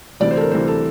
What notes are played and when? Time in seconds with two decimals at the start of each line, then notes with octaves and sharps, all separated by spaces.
0.20 D2 C3 E3 D5
0.31 C5
0.37 A4
0.41 A#4
0.51 D2 C3 E3 C5
0.68 A4